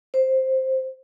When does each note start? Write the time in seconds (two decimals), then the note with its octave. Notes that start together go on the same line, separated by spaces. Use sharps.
0.14 C5